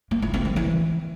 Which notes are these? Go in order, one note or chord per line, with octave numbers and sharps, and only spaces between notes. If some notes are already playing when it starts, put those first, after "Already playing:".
A#3
E4
C4
D#3
E3